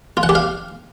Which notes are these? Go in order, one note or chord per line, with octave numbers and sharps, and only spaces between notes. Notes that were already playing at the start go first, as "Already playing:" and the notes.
F4
F#5
G4
F5